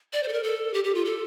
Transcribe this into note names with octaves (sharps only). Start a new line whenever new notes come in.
D5
C5
A4
A#4
A4
G4
G4
F4
A4